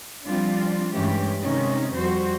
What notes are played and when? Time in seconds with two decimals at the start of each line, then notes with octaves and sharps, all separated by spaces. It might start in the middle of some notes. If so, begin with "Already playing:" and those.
0.24 F3 G3 C4 D4 F4
0.94 G2 E3 G#3 A3 C#4 G4
1.42 C3 D#3 G#3 C#4 D#4
1.95 F2 G3 F#4 C5